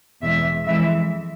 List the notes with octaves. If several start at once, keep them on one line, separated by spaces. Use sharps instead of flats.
E2 B2 G#3 E5
F2 E3 G#3 E5